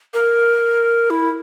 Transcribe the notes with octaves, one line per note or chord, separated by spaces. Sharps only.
A#4
E4